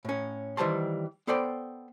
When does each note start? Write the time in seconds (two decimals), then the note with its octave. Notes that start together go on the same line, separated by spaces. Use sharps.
0.05 A2 C#4
0.57 D#3 E3 G3 C5 A5 C6
1.27 B3 A4 C5 D5 G5 B5